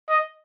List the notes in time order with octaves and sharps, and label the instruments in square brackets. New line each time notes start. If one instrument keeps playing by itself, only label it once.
[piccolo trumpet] D#5